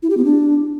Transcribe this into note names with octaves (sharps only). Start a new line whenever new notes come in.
E4
G4
B3
D4